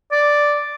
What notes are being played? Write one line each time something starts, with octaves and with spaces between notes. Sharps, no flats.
D5